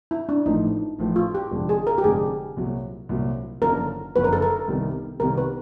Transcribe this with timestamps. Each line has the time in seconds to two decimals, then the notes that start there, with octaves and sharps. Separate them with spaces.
0.11 E4
0.29 D4
0.46 A1 A2 F3 A3 D#4
0.98 A1 A2 F3 A3 E4
1.16 F4
1.35 G4
1.51 F1 F2 D3 F3 G#3
1.69 G#4
1.87 A#4
1.98 G4
2.04 F1 F2 D3 F3 G#3 G#4
2.57 C2 A#2 F#3
3.09 C2 A#2 F#3
3.62 F#1 F#2 D3 F3 A#3 A#4
4.15 F#1 F#2 D3 F3 A#3 B4
4.24 A#4
4.33 A4
4.42 A#4
4.68 C2 C3 D#3 G3 B3
5.20 C2 C3 D#3 G3 B3 A#4
5.38 B4